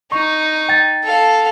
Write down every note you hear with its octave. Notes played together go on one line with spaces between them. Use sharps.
D#4 C#6
G5 A6
A4 F5